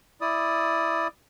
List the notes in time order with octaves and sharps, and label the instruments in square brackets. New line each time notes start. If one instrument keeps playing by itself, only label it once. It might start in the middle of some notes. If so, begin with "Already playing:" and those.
[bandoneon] E4 D5 D#6